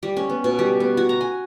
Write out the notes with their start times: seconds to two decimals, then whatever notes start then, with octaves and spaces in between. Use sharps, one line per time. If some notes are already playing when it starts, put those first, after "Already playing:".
0.03 G3
0.17 C#4
0.29 B3
0.44 B2
0.59 G3
0.80 B3
0.97 F#4
1.09 A#5
1.21 G#5